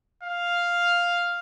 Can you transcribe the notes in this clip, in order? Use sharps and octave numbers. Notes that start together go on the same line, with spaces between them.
F5